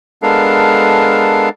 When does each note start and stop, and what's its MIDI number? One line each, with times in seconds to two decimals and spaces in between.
0.23 1.49 56
0.23 1.49 59
0.23 1.49 62
0.23 1.49 69
0.23 1.49 70
0.23 1.49 77